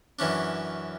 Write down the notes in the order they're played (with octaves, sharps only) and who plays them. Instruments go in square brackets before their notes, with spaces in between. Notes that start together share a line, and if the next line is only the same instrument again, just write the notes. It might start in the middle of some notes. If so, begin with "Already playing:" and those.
[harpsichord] F#2 E3 C#4 D4